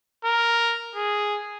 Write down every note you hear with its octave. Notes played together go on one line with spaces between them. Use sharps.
A#4
G#4